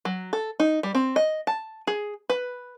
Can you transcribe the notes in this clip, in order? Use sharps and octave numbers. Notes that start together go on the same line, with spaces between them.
F#3
A4
D#4
G3
C4
D#5
A5
G#4
B4